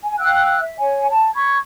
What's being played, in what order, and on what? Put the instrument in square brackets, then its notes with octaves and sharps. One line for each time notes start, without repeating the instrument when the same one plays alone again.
[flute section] G#5
F5 G5 E6 F#6
E5
C#5 G#5
A5
B5 C#6 G#6